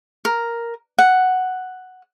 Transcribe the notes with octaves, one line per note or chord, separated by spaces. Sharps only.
A#4
F#5